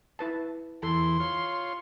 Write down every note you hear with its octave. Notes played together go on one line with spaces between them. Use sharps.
E4 B4 A5
E2 E3 A4 C6
F4 C#5